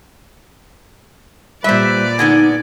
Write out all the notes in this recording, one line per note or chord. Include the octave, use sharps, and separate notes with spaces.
A#2 G3 B4 C5 D5 E5
D3 G#3 B3 D#4 G#5